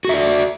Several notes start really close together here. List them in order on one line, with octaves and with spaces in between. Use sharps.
F#4 E5 D5